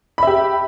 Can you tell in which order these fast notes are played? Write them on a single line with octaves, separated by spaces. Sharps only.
B5 E5 G4